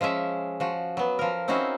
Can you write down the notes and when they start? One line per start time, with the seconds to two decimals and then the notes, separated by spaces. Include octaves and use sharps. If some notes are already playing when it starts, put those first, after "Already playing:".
0.01 F3 G#3 C#4 E5
0.60 F3 F#4
0.97 F#3 B3
1.19 F3 A#4
1.48 C4 C#4 D#4 E4 F#4 C5